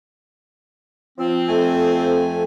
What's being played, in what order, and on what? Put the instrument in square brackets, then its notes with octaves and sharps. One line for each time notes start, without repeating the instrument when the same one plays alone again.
[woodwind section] F3 C4
[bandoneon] F2 A3 G#5